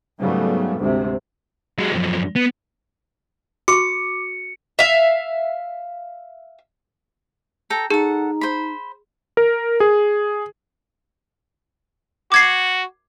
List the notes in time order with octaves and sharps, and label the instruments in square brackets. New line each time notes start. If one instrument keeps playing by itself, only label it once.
[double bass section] G#2 C#3 F#3 G3 A3 B3
D2 G#2 C3
[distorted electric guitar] F#3 G#3
F#2 F3
B3
[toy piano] F#4 C#6 [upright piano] D6 [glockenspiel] C#7
[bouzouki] E5 F5
[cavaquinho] A4 G5 A#5
[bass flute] D#4 [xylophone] G#4 [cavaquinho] A4 F#5
[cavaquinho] C5 B5
[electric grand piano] A#4
G#4
[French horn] F#4 [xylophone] D6 G#6 C7